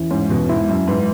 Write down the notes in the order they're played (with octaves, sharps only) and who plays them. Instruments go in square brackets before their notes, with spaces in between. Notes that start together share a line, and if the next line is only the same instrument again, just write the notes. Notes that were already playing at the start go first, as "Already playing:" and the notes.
Already playing: [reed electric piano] E2 E3 C#4 E4
[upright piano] G#2 [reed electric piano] C#4
[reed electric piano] E2 [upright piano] B2
[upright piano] G#2 [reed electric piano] E4
[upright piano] F#2 [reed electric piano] F#3
[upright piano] G#2 [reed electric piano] B4